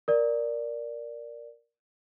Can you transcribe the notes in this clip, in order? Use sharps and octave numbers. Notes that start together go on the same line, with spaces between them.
A#4 D5